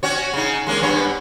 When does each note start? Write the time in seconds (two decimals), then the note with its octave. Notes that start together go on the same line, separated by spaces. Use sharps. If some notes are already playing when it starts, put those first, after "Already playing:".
0.03 C#4 F#4 C#5
0.33 C#3 D#4
0.67 G#3 A#3 C#4
0.82 G2 B3 C#5